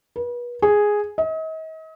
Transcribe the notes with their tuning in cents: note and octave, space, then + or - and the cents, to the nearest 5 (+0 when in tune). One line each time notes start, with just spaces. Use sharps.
B4 -35
G#4 +0
D#5 +40